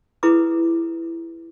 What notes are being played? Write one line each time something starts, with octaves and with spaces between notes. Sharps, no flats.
E4 G#4 B4 A#5 D6 D#6